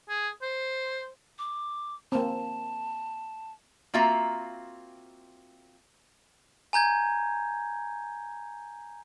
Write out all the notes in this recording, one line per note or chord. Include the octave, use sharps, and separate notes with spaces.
G#4
C5
D6
A#3 C4 A5
A#3 C4 F4 F#4 E5 A#5
G#5 A#5 G6 G#6